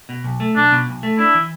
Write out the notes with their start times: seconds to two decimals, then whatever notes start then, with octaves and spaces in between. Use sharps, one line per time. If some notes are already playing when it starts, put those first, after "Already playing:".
0.09 B2
0.24 B1
0.40 A3
0.56 B1 D4
0.72 B2
0.87 B1
1.03 A3
1.19 D4 E4
1.35 E3